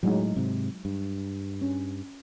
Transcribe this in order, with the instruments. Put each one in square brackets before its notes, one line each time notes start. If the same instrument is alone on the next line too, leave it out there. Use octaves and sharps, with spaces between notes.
[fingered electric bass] A2 [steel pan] F#3 G#3 D#4
[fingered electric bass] G#2 C3
G2
[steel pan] C#4